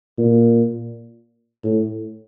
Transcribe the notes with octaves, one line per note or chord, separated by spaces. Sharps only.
A#2
A2